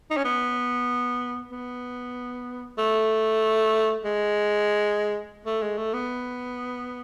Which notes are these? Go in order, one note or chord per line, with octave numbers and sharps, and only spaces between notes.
D#4
C#4
B3
B3
A3
G#3
A3
G#3
A3
B3